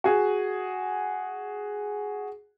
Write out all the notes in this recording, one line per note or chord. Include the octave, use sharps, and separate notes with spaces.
F#4 G#4